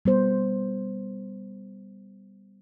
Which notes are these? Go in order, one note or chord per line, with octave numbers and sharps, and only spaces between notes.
G3 B3 C5